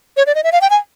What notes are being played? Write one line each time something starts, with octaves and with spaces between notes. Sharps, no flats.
C#5
D5
D#5
E5
F5
G5
G#5